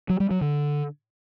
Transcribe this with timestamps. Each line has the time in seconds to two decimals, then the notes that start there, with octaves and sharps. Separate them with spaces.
0.10 F#3
0.20 G3
0.31 F#3
0.41 D3